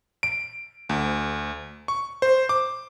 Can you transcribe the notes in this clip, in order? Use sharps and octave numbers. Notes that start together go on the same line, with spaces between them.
D7
D2
C#6
C5
D6